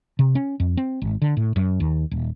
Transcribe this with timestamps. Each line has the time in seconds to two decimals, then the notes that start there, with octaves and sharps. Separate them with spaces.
0.19 C3
0.35 C#4
0.60 F2
0.77 C4
1.02 G#1
1.22 D3
1.37 A2
1.56 F#2
1.80 D#2
2.11 D#1